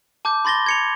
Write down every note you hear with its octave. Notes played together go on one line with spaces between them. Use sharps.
A5 D6 G6
B5 C6 A6 A#6 G7
G#6 C#7 F7